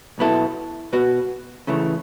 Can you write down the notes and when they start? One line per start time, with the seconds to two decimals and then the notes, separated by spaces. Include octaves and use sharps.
0.18 B1 B2 B3 E4 A4
0.92 B2 B3 F#4 B4
1.67 C#3 E3 A3